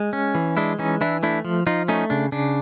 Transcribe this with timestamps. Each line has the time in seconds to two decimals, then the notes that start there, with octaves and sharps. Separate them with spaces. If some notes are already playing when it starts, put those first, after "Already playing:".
Already playing: G#3
0.13 C#4
0.35 E3
0.57 G#3 D4 E4
0.79 E3 C#4 D#4
1.01 E3 D4 E4
1.23 A3 D4 E4
1.45 F3
1.67 F3 D#4 F4
1.88 A3 C#4 D#4
2.10 C#3 D4
2.32 C#3 D4